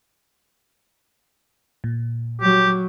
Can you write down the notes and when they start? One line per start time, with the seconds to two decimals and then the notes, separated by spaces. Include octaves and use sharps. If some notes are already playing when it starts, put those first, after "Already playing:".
1.84 A#2
2.41 F#3 G4